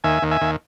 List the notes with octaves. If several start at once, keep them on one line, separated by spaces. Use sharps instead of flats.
D#2 E5 G#5
D#2
E5 G#5
D#2